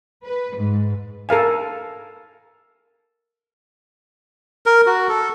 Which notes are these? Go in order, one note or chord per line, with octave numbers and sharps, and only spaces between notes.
B4
G#2
A4 A#4 F5 G#5
A#4
F#4
A4